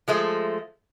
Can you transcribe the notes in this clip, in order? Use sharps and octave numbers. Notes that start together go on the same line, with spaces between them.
F3 G#3 A3